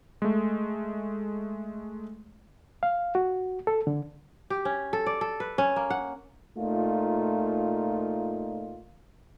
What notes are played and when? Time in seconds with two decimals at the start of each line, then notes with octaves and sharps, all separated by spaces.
0.22 G#3 A3
2.83 F5
3.15 F#4
3.67 A4
3.87 D3
4.50 G4
4.65 C#4
4.93 A4
5.06 D5
5.21 A4
5.40 B4
5.58 C#4
5.76 A#3
5.90 F#5
6.58 A#2 A3 D#4 F4